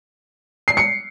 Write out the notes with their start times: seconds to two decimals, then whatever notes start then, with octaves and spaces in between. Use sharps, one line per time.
0.68 C7
0.77 C#7